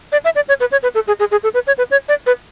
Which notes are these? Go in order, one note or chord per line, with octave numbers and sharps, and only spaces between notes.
D5
E5
D5
C#5
B4
C#5
B4
A4
G#4
G#4
G#4
A4
B4
C#5
B4
C#5
D5
B4